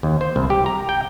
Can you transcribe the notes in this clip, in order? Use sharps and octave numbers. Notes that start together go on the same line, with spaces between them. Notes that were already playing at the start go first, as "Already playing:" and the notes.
D#2
C5
C2
G4
A#5
G5